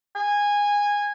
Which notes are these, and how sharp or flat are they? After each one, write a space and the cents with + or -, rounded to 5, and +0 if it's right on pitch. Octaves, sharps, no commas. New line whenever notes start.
G#5 -15